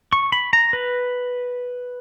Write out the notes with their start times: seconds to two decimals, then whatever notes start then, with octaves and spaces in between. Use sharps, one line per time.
0.13 C#6
0.32 B5
0.53 A#5
0.73 B4